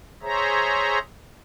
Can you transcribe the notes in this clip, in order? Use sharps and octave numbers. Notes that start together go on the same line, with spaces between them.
G#4 C5 C#5 E5 A#5